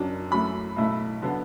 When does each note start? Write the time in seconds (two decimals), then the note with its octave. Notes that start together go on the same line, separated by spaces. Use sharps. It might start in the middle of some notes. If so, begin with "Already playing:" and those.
Already playing: F#1 F#2 F#3 D4
0.31 F#2 F#3 A3 E4 B5
0.76 B1 A2 A3 E4
1.22 D3 F#3 B3